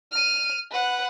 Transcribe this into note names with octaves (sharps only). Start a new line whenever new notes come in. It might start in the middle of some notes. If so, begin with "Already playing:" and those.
F6 D#7
B4 F#5